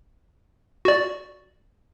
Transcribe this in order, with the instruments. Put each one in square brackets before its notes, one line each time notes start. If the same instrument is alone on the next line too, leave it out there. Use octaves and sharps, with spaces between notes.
[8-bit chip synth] F#4 D5